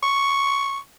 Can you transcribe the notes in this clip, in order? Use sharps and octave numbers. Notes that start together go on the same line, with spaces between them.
C#6